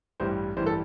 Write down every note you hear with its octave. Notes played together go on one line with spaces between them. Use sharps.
A1 G2 E3 G3 C5
A1 G2 E3 G3 C5
A4